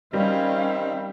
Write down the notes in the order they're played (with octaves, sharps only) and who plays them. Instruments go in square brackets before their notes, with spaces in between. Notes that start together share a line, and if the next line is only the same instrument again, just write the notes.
[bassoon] D#3 [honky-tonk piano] G3 [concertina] C4 [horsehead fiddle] C#4 F5